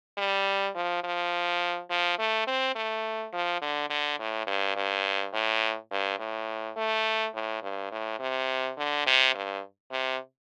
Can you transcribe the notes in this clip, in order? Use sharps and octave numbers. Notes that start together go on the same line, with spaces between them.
G3
F3
F3
F3
A3
C4
A3
F3
D3
D3
A2
G2
G2
A2
G2
A2
A3
A2
G2
A2
C3
D3
C3
G2
C3